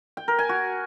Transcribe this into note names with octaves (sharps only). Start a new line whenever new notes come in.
G5
A#4
G#5
F#4